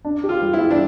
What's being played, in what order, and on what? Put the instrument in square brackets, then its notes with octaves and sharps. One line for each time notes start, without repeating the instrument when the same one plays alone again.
[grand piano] D4
G4
[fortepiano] F4
[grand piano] G3
[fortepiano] E4
[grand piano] G3
[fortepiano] D4